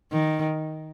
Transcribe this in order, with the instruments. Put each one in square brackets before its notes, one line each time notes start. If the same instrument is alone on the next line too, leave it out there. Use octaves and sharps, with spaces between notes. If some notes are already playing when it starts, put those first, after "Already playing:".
[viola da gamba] D#3